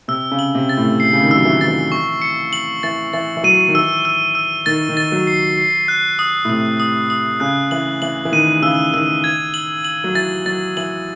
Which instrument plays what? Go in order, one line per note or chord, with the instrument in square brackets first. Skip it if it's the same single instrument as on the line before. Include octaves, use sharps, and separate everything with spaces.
[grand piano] C3 [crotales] E6
[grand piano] C#3
[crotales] F#7
[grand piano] C3
[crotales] A6
[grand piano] A2
[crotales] C7
[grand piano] C#3
D#3
[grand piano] F#3 [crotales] E6
[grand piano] E3
[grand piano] D#3 [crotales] A6
[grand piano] E3
[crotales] C#6
C#7
F#7
[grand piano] E3 [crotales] A6
[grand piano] E3 [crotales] A6
[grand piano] E3
[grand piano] F#3 [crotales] D#7
[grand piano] D#3
[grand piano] E3 [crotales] E6
[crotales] E6
E6
[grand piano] D#3 [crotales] A6
[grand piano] D#3
[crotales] A6
[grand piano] F#3
[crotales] C7
C7
F#6
D#6
[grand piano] A2
[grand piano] C3 [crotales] D#6
[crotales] D#6
D#6
[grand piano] C#3 [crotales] F#6
[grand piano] E3 [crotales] F#7
[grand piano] E3 [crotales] F#7
[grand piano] E3
[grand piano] D#3 [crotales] D#7
[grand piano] C#3 [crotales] E6
[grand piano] D#3 [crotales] E6
[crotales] G#6
F#7
F#7
[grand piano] F#3
[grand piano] E3 [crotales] A6
[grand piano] F#3 [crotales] A6
[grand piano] E3 [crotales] F#7